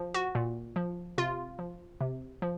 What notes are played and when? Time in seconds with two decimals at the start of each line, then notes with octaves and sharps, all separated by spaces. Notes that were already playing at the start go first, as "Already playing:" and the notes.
Already playing: F3
0.14 F#4
0.35 A#2
0.76 F3
1.18 C3 F4
1.59 F3
2.01 C3
2.42 F3